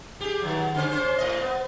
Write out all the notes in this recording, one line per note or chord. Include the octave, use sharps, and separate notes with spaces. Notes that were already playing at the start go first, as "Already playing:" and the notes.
G4 G#4
D#3 F#3
D3 C#4 C5
C#4 C5
A2 D#5
B3